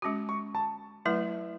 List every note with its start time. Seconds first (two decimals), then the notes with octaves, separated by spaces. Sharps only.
0.02 G#3 C#4 F#4 D6
0.29 C#6
0.55 A5
1.05 F#3 A3 E4 B4 E5